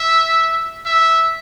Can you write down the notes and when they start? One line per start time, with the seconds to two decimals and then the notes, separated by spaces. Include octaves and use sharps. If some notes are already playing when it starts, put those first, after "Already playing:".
Already playing: E5
0.85 E5